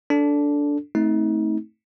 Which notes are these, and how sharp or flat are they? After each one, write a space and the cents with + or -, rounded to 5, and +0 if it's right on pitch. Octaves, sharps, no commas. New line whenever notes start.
D4 -15 A4 +0
A3 +0 C4 +0 D#4 +35